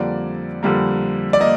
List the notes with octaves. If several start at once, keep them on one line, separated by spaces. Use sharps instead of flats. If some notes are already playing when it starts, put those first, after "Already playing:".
Already playing: F2 D3 G3 A#3 D5
F2 D3 G3 A#3
D5
A#3 D#5